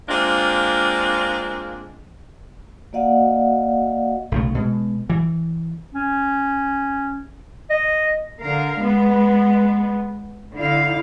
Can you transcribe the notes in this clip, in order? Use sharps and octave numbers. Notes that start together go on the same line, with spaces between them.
G#3 A#3 C4 D4 F4
A#3 F#4 D5 D#5 F5 F#5
B1 C#3 A3
B2 G#3
E3
C#4
D#5
D3 A#4 F5
G#3 B3
D3 E4 F5